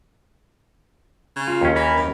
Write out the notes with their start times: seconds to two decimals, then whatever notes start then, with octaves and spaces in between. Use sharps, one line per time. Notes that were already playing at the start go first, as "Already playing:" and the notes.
1.36 C#3
1.48 F4
1.61 D#2 C#4
1.76 E3 A#4 B5
1.97 F#2